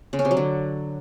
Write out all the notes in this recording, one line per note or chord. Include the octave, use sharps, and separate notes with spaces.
C#3
C#4
C3
F#3
D3